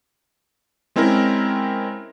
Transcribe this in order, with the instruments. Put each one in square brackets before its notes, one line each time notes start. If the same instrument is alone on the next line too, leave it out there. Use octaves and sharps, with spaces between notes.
[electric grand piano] G#3 C4 C#4 E4 A#4